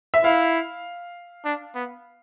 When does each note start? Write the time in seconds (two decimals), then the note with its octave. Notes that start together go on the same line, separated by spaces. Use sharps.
0.14 E5
0.24 E4 F5
1.45 D4
1.75 B3